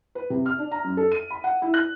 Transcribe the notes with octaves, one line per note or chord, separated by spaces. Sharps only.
B4
C3
F6
D4
A#5
F#2
A4
D#7
B5
F#5
E4
F#6